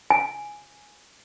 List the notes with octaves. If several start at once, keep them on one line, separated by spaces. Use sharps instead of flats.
G#5